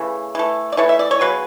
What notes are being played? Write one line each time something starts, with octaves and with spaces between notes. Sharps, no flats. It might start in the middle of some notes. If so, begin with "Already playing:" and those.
Already playing: C#3 E3 A3
E3 A3
D5
E3 A3 C#5
E5
D5
C#5
C#3 F#3 B3 B4